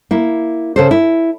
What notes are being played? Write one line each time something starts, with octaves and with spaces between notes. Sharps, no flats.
A#3 E4
C#3 A4 C5
E4